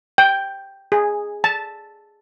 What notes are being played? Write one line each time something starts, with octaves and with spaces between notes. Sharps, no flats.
G5
G#4
A5